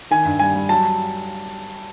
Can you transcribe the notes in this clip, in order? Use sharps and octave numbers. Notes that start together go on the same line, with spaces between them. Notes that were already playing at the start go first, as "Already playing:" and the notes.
D#3 G#5
G2
G3 G#5
G3
F#3 A5